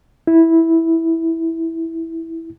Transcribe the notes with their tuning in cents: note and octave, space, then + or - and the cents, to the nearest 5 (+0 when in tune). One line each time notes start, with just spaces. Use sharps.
E4 -10